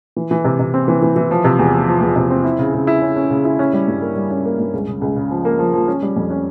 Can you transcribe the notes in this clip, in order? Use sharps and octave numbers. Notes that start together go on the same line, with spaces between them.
E3
E3
C3
C3
C4
E3
E3
E3
F3
C3
E2
F3
F3
E2
C3
C4
E4
C#3
C#3
E4
C#4
C#4
C#3
E4
C#4
G3
G2
A#3
G3
C#4
A#3
G2
C#2
C#3
C#2
C#3
F3
A#3
F3
F3
C#4
G3
F2
C#4